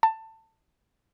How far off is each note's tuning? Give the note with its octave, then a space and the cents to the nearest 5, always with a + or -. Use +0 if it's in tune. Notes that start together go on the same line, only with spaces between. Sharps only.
A5 +20